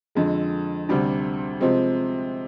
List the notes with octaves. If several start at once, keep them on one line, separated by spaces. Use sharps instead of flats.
F2 D3 G#3
D2 C3 G3 D4
C3 F3 G#3 C4